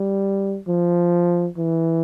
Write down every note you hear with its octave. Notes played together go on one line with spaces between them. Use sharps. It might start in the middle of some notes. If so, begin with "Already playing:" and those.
Already playing: G3
F3
E3